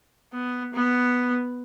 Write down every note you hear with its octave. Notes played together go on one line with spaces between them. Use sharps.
B3
B3